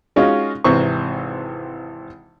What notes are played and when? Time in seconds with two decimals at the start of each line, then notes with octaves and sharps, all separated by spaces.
0.16 G#3 C#4 D#4 F4 F#4
0.64 G#1 C3 E3 C5 C#6